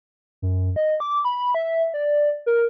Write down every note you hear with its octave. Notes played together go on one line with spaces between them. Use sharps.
F#2
D#5
D6
B5
E5
D5
A#4